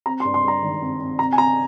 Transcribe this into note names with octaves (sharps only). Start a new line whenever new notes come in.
C4 A#5
C6
G2
C6
G2 A#5
G#1
C4
C4
C3 A#5
G#5
C3 A#5